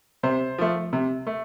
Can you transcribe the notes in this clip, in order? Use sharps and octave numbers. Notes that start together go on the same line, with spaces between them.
C3 C5
F3 A3
C3
A3